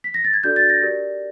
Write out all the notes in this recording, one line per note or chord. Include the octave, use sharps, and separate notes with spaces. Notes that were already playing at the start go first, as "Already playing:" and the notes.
B6
A#6
A6
G#6
D4 F#4 A4 D5 G6
A6
A#6
G4 A#4 D5